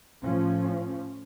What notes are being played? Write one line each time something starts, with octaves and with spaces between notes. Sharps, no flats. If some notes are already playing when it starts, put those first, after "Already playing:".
A2 F3 C#4